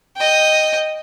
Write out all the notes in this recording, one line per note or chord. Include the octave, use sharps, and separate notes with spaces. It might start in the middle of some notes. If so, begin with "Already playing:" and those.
D#5 G5